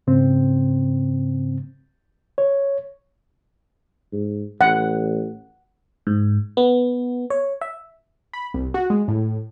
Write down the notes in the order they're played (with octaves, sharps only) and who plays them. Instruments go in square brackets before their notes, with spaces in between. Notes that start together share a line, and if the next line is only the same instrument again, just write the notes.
[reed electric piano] G#2 C#3 C4
C#5
[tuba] G#2
[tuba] A1 [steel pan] F#5
[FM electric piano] G#2
B3
C#5
E5
[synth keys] B5
C2
F#4
G#3
A2